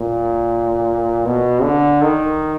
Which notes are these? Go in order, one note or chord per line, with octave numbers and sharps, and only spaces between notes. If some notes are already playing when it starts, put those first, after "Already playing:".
Already playing: A#2
B2
D3
D#3